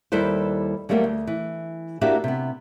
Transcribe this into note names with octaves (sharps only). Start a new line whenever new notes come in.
D#2 G3 E4 A4 B4 C5
F#3 G3 A3 A#3 F4 G4
D2
E3
A#3 D4 E4 F#4 G4 E5
C3 B3